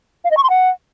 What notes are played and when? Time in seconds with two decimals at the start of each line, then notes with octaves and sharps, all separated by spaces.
0.24 F5
0.31 D#5
0.37 C#6
0.43 C6
0.50 F#5